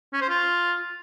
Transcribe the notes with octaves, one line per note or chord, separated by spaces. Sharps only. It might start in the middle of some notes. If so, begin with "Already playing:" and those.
C#4
C5
F4